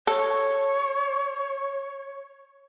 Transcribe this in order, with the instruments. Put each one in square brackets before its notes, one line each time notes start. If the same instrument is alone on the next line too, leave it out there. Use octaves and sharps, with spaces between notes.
[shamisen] A4 [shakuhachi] C#5